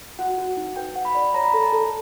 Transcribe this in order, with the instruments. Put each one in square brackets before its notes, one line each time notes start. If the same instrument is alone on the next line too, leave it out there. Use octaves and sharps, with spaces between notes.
[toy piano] F#4 [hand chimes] F#5
[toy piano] F#4
D#4
[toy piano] B4 [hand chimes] G5
[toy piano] F#5
[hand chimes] B5
[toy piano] D5
[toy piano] C#5 [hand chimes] A#5
[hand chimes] B5
[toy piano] A4 [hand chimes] A#5
[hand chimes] A5
[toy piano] A4